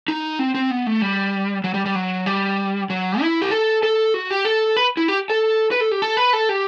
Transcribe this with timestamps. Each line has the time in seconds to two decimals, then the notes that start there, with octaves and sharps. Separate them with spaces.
0.08 D#4
0.39 C4
0.54 C4
0.71 B3
0.87 A3
1.02 G3
1.64 F#3
1.74 G3
1.86 G3
1.95 F#3
2.26 G3
2.90 F#3
3.21 E4
3.42 G4
3.51 A4
3.83 A4
4.14 F#4
4.31 G4
4.45 A4
4.77 B4
4.97 E4
5.08 G4
5.30 A4
5.71 B4
5.81 A4
5.92 G4
6.02 A4
6.17 B4
6.33 A4
6.49 G4